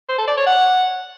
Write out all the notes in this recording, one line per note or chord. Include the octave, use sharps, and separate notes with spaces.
C5
A4
D5
C#5
F#5